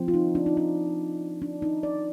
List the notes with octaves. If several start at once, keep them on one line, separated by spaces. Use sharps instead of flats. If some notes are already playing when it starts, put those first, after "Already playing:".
Already playing: F3 C4
F4
D#4
D4
D#4
D4
D4
D#4
D5